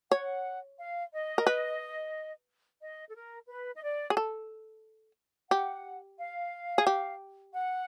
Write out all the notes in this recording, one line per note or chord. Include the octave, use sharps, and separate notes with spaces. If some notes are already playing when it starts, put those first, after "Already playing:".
C#5 F#5
F5
D#5
A#4
B4
D#5
A4
A#4
B4
D#5
D5
G#4
A4
G4 F#5
F5
G#4
G4
F#5